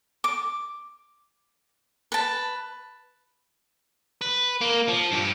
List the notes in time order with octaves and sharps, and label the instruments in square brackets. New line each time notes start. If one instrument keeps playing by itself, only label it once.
[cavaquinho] D6
B4 A5
[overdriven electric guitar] B4
A#3
F3
G2 G4